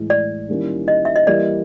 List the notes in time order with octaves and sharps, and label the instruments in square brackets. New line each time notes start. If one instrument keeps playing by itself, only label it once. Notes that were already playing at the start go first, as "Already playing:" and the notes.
Already playing: [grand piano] A2 E3 G#3
[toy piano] D5
[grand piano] D#3 G3 A#3 C#4 E4
[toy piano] D#5
E5
D#5
[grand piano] E3 G3 A#3 [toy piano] D5